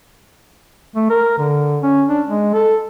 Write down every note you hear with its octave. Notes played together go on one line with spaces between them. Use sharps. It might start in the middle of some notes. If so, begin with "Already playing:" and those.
A3
A#4
D3
C#4
D4
G#3
A4